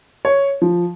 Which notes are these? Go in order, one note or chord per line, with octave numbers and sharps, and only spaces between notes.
C#5
F3